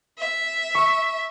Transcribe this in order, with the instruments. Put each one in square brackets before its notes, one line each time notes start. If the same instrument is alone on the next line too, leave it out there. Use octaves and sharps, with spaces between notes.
[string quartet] E5
[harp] C#6 E6